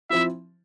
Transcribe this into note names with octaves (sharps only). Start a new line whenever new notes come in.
F3 C4 E4 E5